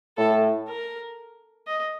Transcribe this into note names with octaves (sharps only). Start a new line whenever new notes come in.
A2 A4
A#4
D#5